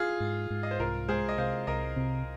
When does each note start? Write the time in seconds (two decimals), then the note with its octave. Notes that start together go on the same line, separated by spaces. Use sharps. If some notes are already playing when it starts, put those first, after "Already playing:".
Already playing: F4 G#4
0.20 G#2
0.50 G#2
0.63 D#5
0.71 C5
0.79 C2 F4 A#4
1.08 G#3 G#4 C5
1.29 D#5
1.38 C3 C5 F5
1.67 C2 A#4 D#5
1.96 C3